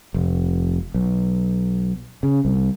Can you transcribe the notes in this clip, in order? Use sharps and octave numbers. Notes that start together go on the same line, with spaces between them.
F1
B1
C#3
C2